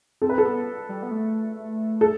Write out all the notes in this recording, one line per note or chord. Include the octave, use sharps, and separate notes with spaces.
C4 A4
B4
A4
B3
G3
B3
A3
A4